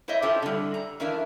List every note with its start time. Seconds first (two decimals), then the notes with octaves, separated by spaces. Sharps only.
0.08 E4 C5 C#5 D#5 E5
0.22 C4 E4 F4 G4 A4 C5
0.42 D3 G3
0.74 A#5
1.00 D#3 E3 D4 E4 A#4 F5